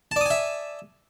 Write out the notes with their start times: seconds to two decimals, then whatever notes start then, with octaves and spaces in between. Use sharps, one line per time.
0.11 A5
0.16 D5
0.21 D#6
0.26 G#5
0.31 E5